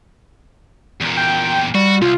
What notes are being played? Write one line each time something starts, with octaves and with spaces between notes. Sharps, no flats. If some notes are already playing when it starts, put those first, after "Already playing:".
E2 A#2
G5
G3 F#4
C2 F4